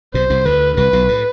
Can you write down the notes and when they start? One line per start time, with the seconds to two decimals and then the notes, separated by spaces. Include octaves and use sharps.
0.14 B1 B2 C5
0.30 C2 C3
0.46 D2 D3 B4
0.77 C2 C3 B4
0.93 B1 B2
1.08 A2